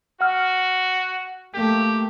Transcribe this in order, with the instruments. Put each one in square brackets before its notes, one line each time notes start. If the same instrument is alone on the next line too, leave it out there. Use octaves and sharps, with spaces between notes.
[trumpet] F#4 [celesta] F#5 F6
[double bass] A3 A#3 [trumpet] G4